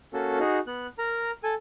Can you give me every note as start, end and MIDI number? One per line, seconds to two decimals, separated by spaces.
0.13 0.39 58
0.13 0.39 61
0.13 0.39 66
0.13 0.39 69
0.40 0.59 63
0.40 0.59 66
0.40 0.59 68
0.67 0.87 59
0.67 0.87 90
0.98 1.31 70
0.98 1.31 82
1.43 1.54 69
1.43 1.54 80